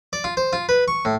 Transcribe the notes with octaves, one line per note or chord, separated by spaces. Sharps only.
D5
F4
C5
F4
B4
C#6
A2